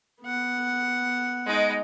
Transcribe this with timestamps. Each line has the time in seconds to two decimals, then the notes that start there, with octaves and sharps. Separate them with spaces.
0.21 B3 F#5
1.46 G#3 D#4